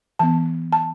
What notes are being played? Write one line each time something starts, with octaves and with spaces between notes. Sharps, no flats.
E3 B3 A5
A5